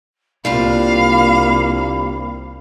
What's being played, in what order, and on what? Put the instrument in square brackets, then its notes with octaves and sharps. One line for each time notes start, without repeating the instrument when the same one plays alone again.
[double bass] C2 A#3 [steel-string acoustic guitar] G3 D4 F4 [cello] F5 [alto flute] B5